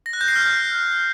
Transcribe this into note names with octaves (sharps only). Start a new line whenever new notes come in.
A#6
F#6
G6
C7
F6